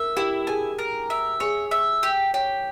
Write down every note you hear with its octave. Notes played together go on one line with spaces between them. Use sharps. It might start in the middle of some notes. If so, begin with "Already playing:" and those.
Already playing: A#4 E5
E4 G4
G#4 G#5
A#4
E5
G#4 C#5
E5
G4
G4 C#5